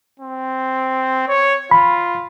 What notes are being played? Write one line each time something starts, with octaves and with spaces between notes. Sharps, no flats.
C4
C#5
F4 B5